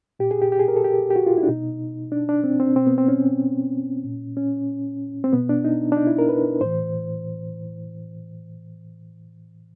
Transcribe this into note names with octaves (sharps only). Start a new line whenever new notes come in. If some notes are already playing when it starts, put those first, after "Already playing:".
A#2 G4
G#4
G4
G4
G#4
A#4
A4
G4
G4
F#4
F4
E4
D4
B2 D#4
D4
D4
C4
C4
B2 C4
B3
C4
C#4
A#2
C#4
C4
B2 B3
D4
D#4
D4
D#4
E4
A#4
B4
A2 E3 C5